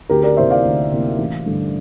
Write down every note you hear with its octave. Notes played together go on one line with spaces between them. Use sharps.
D2 G4 A#4
A#4 D5
C3 E3 A#3 C5 E5
D5 F5
D2
C3 E3 A#3
A1
G2 D3 A3